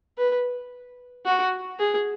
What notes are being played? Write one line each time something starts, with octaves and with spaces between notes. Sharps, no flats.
B4
F#4
G#4